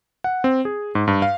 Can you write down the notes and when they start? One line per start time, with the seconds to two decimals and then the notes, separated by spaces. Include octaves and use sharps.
0.24 F#5
0.44 C4
0.65 G#4
0.95 G#2
1.07 G2
1.22 F5